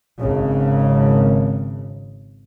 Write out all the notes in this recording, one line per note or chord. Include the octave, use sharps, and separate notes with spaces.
G#1 C#3